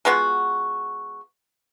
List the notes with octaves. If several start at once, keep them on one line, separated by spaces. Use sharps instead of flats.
G#3 B3 F4 F#4